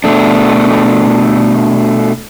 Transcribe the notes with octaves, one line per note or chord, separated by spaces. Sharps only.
B2 A3 D4